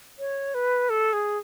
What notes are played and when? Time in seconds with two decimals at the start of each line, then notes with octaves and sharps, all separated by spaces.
0.19 C#5
0.54 B4
0.89 A4
1.13 G#4